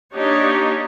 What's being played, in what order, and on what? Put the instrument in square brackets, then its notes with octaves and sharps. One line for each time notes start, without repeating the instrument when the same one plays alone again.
[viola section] A#3 D4 D#4 G4 C#5